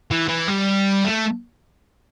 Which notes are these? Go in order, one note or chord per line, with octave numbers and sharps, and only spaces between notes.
E3
E3
G3
A3